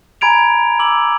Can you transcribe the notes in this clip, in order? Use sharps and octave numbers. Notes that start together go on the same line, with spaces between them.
G#5 A#5 B5 G#6 D7 F7
D6 E6 F#7